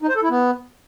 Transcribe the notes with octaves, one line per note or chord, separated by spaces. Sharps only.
D#4
C5
A4
E4
B3